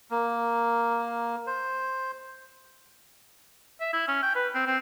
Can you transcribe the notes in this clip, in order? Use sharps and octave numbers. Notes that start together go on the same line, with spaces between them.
A#3
C5
E5
E4
C#4
G5
B4
C4
C4